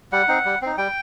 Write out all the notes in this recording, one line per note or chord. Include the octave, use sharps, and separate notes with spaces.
G3 F#5
C4 D#4
G3
C4 D#4
G3 G5